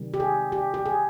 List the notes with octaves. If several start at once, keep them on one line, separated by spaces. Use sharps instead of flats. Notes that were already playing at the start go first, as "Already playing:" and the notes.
Already playing: C3 D#3 G3
G4
G#4
G4
G4
G#4